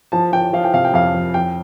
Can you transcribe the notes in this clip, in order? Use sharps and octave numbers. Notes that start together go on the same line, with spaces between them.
F3 A5
F3 G5
F3 F5
G5
C3 F5
G5
F2 F5
F3
F2 G5